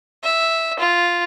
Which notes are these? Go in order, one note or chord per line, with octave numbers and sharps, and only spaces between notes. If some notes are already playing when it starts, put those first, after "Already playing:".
E5
F4